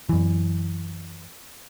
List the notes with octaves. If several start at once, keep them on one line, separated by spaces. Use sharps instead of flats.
F#2 E3